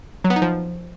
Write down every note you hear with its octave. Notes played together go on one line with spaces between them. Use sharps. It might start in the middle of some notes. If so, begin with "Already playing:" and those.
F#3
B3
D#4
F3